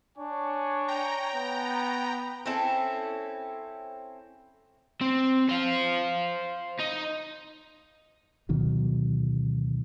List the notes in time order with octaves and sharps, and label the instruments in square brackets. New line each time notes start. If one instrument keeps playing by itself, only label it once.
[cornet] D4 [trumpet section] C#5 G#5 C#6
[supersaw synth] G5 A#5
[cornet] B3
[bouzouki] C4 C#4 E4 A4
[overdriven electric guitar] C4
C5 F5
D#4
[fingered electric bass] D2 B2 D#3 F#3